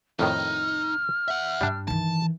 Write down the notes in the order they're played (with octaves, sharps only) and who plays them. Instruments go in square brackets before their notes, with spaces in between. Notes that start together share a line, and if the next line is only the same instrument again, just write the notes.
[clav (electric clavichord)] F2 A2 D#3 [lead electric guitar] D#4 [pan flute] F6
[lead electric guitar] E5 F#5
[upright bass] G2 [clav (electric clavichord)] G3 D4
[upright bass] D#3 E3 [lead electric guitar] A5